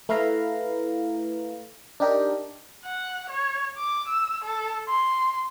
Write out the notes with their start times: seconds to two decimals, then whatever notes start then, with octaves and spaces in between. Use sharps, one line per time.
0.09 A3 E4 B4 F5 A#5
2.00 D4 D#4 G4 A#4
2.84 F#5
3.30 C#5
3.77 D6
4.08 E6
4.44 A4
4.88 C6